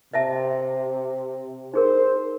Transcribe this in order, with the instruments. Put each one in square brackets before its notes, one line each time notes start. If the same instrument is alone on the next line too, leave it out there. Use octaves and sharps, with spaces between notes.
[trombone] C3 [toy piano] D#5 E5 A5
[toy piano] D#4 G#4 A#4 [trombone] C5